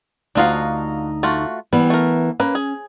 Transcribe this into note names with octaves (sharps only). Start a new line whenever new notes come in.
D2 D4 D#4 F4 F#4 F5
A3 F4 F#4
E3 G3 B3
A3 A#4
A#3 C#4 B4
G#4